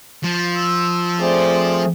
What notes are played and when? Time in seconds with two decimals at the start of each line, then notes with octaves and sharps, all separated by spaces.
0.24 F3
0.57 E6
1.19 A3 C4 G#4 C5 D5